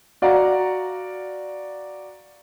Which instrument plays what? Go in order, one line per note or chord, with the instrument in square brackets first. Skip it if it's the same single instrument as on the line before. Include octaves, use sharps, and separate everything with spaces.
[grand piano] F#4 D5 F5 F#5 A#5